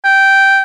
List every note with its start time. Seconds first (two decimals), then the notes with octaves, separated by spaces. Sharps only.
0.04 G5